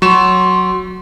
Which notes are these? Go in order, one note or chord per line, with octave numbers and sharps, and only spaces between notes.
F#3 C6 C#6 E7